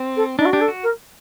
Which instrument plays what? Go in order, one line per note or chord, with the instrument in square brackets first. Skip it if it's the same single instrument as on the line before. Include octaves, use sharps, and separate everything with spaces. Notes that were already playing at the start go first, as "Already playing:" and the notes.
Already playing: [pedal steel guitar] C4
[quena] A4
[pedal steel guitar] D4 [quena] D#4
[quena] F#4
[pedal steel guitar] D4 [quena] G4
[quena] A4
[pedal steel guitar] F#4
[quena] A#4